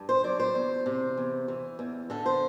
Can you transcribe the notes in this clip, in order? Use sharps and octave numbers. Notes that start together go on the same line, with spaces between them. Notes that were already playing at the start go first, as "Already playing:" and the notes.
Already playing: G2
C5
F#3 D5
C5
E2
C3
E2
E3
E2
D3 A4
C5